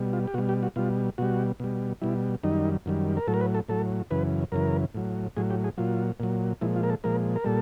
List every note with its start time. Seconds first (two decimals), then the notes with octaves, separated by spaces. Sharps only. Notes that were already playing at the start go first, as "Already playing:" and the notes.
Already playing: B2 G3
0.13 F4
0.27 G4
0.34 B2 F#4
0.38 G3
0.49 G4
0.63 F#4
0.76 B2 G3 F4
1.18 B2 G3 F#4
1.60 B2 G3
2.02 B2 G3 E4
2.43 F#2 D#3 G3 D#4
2.86 F#2 D#3 G3
3.17 A#4
3.28 A2 F#3 A4
3.34 A#4
3.41 B4
3.54 A4
3.69 A2 F#3 A4
4.11 F#2 C#3 E3 B4
4.52 F#2 C#3 E3 A#4
4.95 A2 F#3
5.37 A2 F#3 G#4
5.50 G4
5.64 G#4
5.78 A#2 F#3 F4
6.20 A#2 F#3
6.61 A#2 F3 G#3 E4
6.76 F4
6.83 A#4
6.90 A4
7.04 A#2 F3 G#3 A#4
7.36 A#4
7.44 A#2 G3 A4